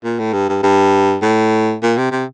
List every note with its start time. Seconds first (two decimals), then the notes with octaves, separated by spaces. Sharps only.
0.04 A#2
0.19 A2
0.33 G2
0.49 G2
0.63 G2
1.22 A2
1.82 A#2
1.97 C3
2.11 C3